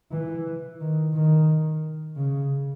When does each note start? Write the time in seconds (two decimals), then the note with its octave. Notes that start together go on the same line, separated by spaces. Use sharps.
0.11 E3
0.80 D#3
1.14 D#3
2.16 C#3